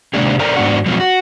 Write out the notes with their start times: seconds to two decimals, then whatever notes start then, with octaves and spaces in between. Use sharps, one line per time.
0.14 C3 D#3 G#3 A#3 D4 G#4
0.39 A4 A#4 C5 D5 A#5
0.56 G#2 C3 B3 D4 F#4 F#5
0.86 B2 F3 F#3 G#3
1.00 F#4